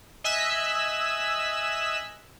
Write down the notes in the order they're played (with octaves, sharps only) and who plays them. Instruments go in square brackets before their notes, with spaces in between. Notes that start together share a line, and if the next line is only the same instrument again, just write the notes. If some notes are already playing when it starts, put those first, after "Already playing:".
[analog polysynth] D#5 E5 G#5 E6 F#6 B6